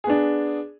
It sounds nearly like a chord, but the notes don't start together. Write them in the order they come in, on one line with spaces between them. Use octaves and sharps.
G#4 B3 D4